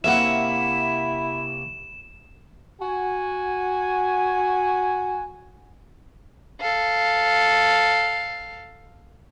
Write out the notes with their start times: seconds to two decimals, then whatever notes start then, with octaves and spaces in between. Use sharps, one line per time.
0.04 C3 A#3 C#4 E4 E5 F#5 E7
2.81 F#4 G#5
6.60 A4 F5